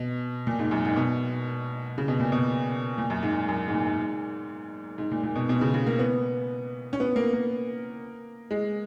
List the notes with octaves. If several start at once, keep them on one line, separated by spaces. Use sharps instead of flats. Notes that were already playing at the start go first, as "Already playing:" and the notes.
Already playing: B2
A#2
G#2
F#2
G#2
B2
C#3
B2
A#2
B2
A#2
F#2
G#2
G#2
F#2
G#2
A#2
G#2
G#2
A#2
A#2
B2
B2
C#3
C#3
A#3
B3
C#4
B3
A#3
A#3
G#3